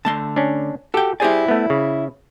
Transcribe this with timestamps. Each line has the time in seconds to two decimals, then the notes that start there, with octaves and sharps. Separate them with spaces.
0.05 D3 A3 A5 C6
0.36 C#4 D4
0.94 F#4 G4 A4 G5
1.20 E4 G4 G#4 C5 D5 G#5
1.48 A3 B3
1.70 C#3